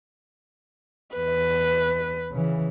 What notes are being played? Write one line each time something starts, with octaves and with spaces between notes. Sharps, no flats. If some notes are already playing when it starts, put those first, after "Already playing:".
E2 B4
C#3 E3